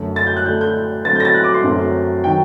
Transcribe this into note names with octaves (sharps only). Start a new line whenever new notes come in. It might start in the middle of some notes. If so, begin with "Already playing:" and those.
Already playing: F#2 D3 A3
A6
G6
F#6
D3 A3 D4 G6
G6
D3 F#3 A3 C4 A6
G6
A#6
A6
F#6
D6
C6
F#2 D3 F#3 A3 C4
D#3 F#3 G5